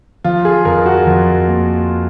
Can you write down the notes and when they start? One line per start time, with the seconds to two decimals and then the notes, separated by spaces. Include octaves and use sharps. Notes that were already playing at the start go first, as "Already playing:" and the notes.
0.24 F3 F4
0.45 G#4
0.65 F2 A#4
0.86 F#4
1.07 F2
1.48 A#3